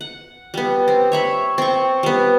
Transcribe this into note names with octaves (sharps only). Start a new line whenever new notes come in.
F#5
G3 B3
C4
C#5 E5 B5
C4 C#6
G3 B3